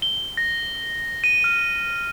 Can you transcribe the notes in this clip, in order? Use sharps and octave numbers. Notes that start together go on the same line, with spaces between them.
G7
A#6
D#7
F6